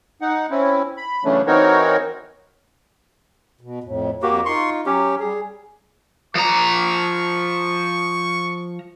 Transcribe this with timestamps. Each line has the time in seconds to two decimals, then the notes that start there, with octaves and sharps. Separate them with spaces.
0.21 D#4 F#5
0.51 C4 C#4 E4
0.97 B5
1.25 C#3 E3 F#3 A3 C#4 D4
1.47 E3 C4 D#4 F#4 A#4 C#5
3.61 B2
3.84 F2 A2
4.23 F2 A#3 F#4 G4
4.45 D#4 F4 C6 C#6
4.86 F#3 C#4 G4
5.20 G3 G#4
6.35 F3 A#5 C#6